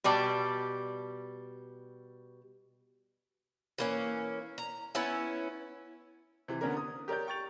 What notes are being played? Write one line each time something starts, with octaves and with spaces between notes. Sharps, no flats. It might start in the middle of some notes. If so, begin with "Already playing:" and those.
B2 G3 D5 A5
E3 A#3 C#4
A#5
B3 C#4 E4
C3 E3
D3 B3 C#4 D4 A#4
D#6
G4 A#4 C#5 D5 G6
G5 C#6 G6 A6 F7